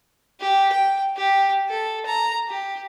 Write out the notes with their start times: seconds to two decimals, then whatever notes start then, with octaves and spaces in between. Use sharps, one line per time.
0.40 G4
0.72 G5
1.17 G4
1.69 A4
2.06 A#5
2.49 G4